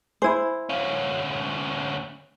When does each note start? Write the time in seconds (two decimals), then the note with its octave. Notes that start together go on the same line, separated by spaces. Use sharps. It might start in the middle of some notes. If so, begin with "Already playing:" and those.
0.22 E4 C5 G#5 B5
0.69 D2 C#4 F5